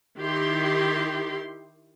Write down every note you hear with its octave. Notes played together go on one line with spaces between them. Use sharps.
D#3 E4 G4 C6